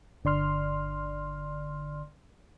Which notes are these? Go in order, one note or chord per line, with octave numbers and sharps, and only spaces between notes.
G1 D3 D5 C6 F6